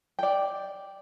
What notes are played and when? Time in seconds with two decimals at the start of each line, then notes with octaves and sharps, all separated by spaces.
0.19 D5 G5